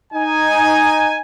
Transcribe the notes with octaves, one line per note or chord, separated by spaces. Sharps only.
D#4 G#5